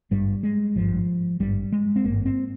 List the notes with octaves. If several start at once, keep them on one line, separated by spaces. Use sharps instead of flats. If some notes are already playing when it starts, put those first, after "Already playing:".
G#1 G2 G3
G#3
G#1 G2 F3
G#1 G2 G3
G#3
C4
G#1 G2 A#3
C4